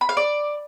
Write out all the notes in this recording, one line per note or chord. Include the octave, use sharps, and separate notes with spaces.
B5
F5
D5